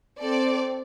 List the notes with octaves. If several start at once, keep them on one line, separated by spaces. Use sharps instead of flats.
C4 A4 D5